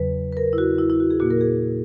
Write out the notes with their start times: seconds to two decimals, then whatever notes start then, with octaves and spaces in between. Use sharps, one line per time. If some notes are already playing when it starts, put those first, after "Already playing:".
Already playing: E2 C#3 F#3 B4
0.32 B4
0.37 A#4
0.53 E4
0.58 F#4
0.78 E4
0.90 E4
1.00 F#4
1.10 G#4
1.20 A#2 A#3 F#4
1.30 A#4
1.41 G#4